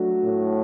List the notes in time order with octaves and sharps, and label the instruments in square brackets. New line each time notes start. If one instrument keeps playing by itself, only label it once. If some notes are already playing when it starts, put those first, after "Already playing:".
Already playing: [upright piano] F#3 A3 D4 F#4
[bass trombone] A2